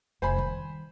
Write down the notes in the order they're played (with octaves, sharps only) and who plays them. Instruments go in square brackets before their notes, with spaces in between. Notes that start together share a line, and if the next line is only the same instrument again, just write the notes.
[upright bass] F1 [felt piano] C5 G#5 B5
[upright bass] D#3 G3